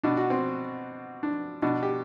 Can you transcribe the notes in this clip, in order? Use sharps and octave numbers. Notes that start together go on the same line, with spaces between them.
B2 D4
F#4
C4
D4
B2 D4
G4